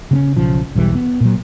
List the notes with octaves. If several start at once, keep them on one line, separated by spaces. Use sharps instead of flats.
C#3 C4 C#4
B1 C#3 F3
E1 B1 E3 G3
B3
A#2 F#3